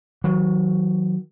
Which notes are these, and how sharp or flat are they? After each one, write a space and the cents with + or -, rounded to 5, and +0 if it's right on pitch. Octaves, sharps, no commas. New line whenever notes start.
D#3 +40 F#3 +0